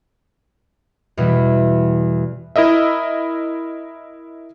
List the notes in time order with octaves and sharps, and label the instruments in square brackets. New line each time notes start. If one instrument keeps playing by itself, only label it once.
[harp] E2 B2 E3 G3
[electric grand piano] E4 A#4 D#5 E5